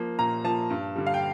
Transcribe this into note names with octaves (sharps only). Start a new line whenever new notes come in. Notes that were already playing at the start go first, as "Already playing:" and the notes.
Already playing: F3 A#3
A#2 A#5
F3 A#3 A5
G2
D3 G3
F5
G5